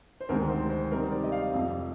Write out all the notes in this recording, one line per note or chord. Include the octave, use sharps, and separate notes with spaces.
C5
D2 C3 D#3 G#3 C4 A#4
C5
C5
C3 G3 C4 D#4 A#4
D5
D#5
F5
F2 C3 F3